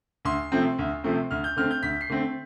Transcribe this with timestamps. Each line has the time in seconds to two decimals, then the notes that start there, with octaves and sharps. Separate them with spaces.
0.25 D2 C6
0.52 C3 F3 A3 C4
0.79 D2
1.04 C3 F3 A3 C4
1.31 D2 F6
1.44 G6
1.56 D3 A3 C4 F6
1.71 G6
1.83 D2 B6
2.01 C7
2.09 D3 A3 C4